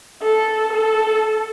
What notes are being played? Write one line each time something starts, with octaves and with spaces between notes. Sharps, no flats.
A4
A4